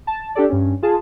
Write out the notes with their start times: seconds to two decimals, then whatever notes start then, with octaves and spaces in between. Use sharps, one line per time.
0.07 A5
0.35 D4 G4 A4 D5
0.49 G2 C#4
0.82 F4 G#4 A5